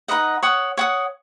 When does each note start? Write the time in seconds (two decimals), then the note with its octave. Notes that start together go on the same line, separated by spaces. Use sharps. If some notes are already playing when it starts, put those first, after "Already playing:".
0.08 D#4 B4 D#5 F#5
0.43 C#5 F#5 D#6
0.77 C#5 F#5 D#6